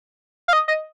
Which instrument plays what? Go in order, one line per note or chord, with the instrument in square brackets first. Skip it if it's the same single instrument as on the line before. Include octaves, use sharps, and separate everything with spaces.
[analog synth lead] F5
D#5
D#5